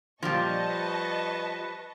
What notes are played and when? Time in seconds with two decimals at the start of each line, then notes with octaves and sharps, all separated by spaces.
0.23 A#2 F3 G3 D#5 A5 C#6
0.69 B4